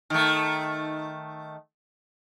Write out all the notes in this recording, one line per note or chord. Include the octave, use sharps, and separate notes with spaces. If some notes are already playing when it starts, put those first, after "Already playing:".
D#3 A3